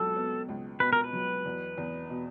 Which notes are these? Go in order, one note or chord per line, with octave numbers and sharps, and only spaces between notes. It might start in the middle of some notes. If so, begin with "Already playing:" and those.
Already playing: C#2 B2 F#3 A4
B3
C#2
B2 B4
A#4
B4
F#3
E2
E2
B2